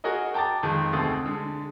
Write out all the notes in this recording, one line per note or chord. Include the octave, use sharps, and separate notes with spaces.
F#4 G#4 A#4 C#5 D#5
G5 A5 A#5 D6 A6
F2 D#3 G#3
D2 B2 C4 A4 D#6 A6
D3 G#3